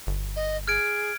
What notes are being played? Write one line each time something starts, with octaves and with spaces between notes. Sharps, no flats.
G1
D#5
G#4 F6 G#6 D7